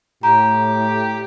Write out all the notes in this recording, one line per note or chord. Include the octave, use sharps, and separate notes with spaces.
A2 G4 A#5